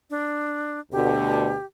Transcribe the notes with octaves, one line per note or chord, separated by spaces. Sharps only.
D4
D2 B2 D3 G4